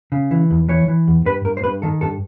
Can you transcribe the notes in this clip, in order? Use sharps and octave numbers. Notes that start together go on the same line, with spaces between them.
C#3
E3
E2
E3 C#5
E3
E2
G2 B4
G2 A#4
C5
G2 B4
D#3 A4
G2 A4